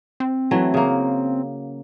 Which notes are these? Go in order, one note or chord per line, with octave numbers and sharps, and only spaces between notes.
C4
E3 F#3 A3
C#3 A#3